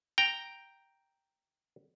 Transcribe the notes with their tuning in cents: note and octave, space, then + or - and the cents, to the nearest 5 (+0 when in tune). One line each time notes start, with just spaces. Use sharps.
G5 +0 A#5 +0